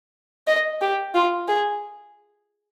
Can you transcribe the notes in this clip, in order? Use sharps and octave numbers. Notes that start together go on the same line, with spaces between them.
D#5
G4
F4
G#4